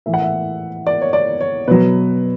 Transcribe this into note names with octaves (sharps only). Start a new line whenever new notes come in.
A2 E3 E5
F#5
E5
D5
C#5
D5
C#5
B2 F#3 B4